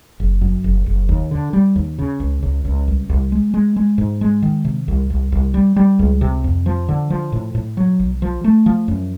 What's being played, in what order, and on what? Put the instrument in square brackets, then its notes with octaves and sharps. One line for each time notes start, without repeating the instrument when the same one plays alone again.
[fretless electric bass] F#1
F#2
F#1
F#1
D#2
D3
G3
D#2
C#3
C#2
C#2
C#2
C2
C2
G#3
G#3
G#3
G#2
G#3
D#3
C3
C2
C2
C2
G3
G3
C#2
C3
F2
F3
D3
F3
A2
A2
F#3
B1
F3
A3
F3
F#2